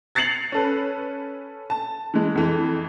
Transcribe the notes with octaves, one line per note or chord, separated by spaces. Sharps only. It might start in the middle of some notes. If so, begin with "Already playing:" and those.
G#6 A6 C7 C#7 F7 F#7
C#4 A4 B4
A5
E3 G#3
F2 E3